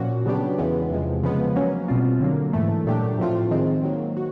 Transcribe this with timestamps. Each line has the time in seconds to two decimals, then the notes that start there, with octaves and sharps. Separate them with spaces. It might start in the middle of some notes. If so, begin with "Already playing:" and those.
Already playing: A#2 F3 A#3 C#4 F#4
0.25 C#3 F#3 B3 D4 G4
0.58 E2 C#3 E3 G#3 B3
0.90 E2 C3 F3 G#3
1.23 C#3 F3 G#3 B3
1.55 F#3 A#3 C#4
1.88 B2 G3 C4 F4
2.20 D3 F#3 A#3
2.53 G#2 E3 A3
2.85 A#2 F#3 A3 D4 G4
3.19 A2 F3 A3 C4 F4
3.51 D#3 G#3 C4
3.83 D#3 F#3 A#3
4.17 F#4